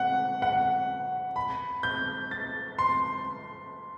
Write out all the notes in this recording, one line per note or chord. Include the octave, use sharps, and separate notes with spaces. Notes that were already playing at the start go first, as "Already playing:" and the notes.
Already playing: F#5
F#5
B5
G6
A6
C6